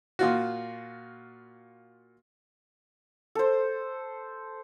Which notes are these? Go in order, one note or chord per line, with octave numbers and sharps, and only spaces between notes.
A#2 F4 F#4
A4 C5